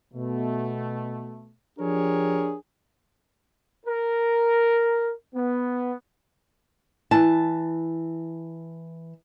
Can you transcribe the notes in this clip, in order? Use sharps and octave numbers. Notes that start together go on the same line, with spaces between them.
B2 A3
F3 D4 G4 G#4 A#4 C#5
A#4
B3
E3 A5